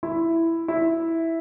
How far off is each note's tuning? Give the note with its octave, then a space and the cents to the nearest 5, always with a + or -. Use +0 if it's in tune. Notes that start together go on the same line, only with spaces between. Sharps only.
E4 +5
E4 -5